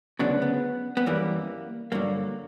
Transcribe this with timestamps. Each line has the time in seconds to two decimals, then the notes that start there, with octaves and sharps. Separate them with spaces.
0.19 D2 C#3 F#3 B3 D4
0.42 B3
0.97 B3
1.06 F#2 E3 G3 A#3
1.92 G2 D3 F#3 A#3